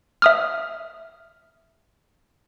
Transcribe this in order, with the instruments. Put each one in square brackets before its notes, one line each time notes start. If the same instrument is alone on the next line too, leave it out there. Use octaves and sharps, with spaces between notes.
[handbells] E5 D#6 F6